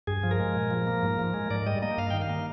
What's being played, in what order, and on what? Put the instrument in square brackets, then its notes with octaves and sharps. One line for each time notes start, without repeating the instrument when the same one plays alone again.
[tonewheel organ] G2 G#4
F3
A#4
G#3
A#2
F3
A#3
G#2
F3
G#3
G#2 D5
G3 D#5
A#3 D#5
G2 F5
D#3 G5
F5
A#3